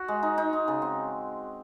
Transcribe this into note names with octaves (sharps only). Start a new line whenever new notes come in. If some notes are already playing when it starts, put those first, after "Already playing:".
Already playing: F#4
G#3
D#4
D#4
D#4
C#3
C4